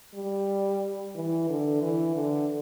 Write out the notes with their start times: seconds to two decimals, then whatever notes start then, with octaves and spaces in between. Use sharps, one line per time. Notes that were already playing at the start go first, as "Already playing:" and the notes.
0.15 G3
1.16 E3
1.49 D3
1.82 E3
2.16 D3